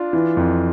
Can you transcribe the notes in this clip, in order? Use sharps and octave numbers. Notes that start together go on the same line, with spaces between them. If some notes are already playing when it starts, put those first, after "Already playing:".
Already playing: D4 F4
E3
F2